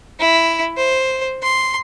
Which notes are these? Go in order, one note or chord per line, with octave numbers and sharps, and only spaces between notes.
E4
C5
C6